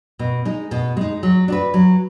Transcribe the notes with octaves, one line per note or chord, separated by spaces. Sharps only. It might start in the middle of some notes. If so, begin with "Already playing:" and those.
B2
G#3 D#4
B2
G#3 D#4
F#3
D4 F#4 B4
F#3